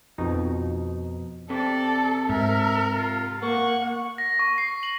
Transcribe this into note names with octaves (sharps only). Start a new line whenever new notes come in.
F2 B2 D#4
C3 A4 D5
G#2 A#4 E5
F4
A#3 F#5 C#6
A#6
C#6
C7
F#7